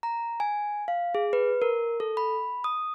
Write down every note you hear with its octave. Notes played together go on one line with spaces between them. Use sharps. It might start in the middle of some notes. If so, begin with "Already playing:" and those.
A#5
G#5
F5
G#4
B4
A#4
A4
B5
D#6